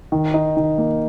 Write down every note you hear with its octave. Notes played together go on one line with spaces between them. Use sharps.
D#3
D#4
D#3
A#3